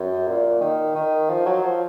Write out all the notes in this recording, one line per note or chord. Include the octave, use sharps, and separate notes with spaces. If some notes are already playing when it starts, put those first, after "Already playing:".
Already playing: F#2
A#2
D#3
D#3
F3
F#3
F3